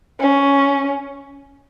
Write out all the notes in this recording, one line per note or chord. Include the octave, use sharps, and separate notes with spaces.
C#4